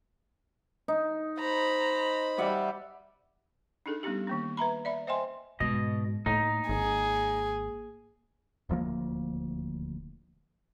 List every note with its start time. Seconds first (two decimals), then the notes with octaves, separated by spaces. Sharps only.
0.88 D#4
1.39 C5 A#5 B5
2.38 G3 E5 F#5
3.86 D4 D#4 G#4 A4
4.03 G3 B3 C#4 D#4 G4
4.27 D#3 A#3 C#4
4.57 B4 E5 A#5 B5
4.85 D5 E5 B5
5.07 C5 D#5 E5 G5 G#5 C6
5.60 G#2 B2 D#5
6.26 A2 A#3 D#4
6.69 G#1 G#4
8.69 D#1 D2 F3 A#3